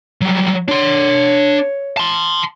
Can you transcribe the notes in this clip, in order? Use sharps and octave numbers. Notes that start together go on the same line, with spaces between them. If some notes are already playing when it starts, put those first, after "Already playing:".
F#3 G3
D4 C#5 C6
A5 C6